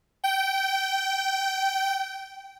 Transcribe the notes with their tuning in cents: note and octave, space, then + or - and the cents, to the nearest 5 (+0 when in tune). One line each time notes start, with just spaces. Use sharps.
G5 -20